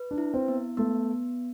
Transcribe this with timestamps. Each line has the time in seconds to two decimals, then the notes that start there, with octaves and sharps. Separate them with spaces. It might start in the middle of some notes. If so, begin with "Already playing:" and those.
Already playing: B4
0.11 D4
0.18 E4
0.34 C4
0.48 B3
0.77 A3 B3